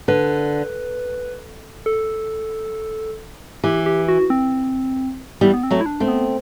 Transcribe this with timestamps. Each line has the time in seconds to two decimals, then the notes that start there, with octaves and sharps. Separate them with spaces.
0.08 D3 B4
1.86 A4
3.64 E3 G4
3.86 G4
4.08 F#4
4.30 C4
5.41 E3 G3 B3
5.54 B3
5.63 C4
5.71 F#3 A3
5.81 E4
5.86 D4
6.00 A3 C4
6.08 B3